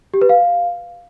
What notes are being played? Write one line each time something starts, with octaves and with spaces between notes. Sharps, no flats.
G4
B4
F5